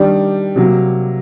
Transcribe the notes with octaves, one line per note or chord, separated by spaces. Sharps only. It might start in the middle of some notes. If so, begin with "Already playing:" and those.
Already playing: D#3 G3 D4
C3 F#3 A#3